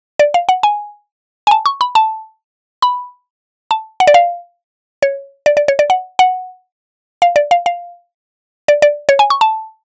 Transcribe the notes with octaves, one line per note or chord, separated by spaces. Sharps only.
D5
F5
F#5
G#5
G#5
A5
C#6
B5
A5
B5
A5
F#5
D5
F5
C#5
D5
D5
C#5
D5
F#5
F#5
F5
D5
F5
F5
D5
D5
C#5
G#5
C#6
A5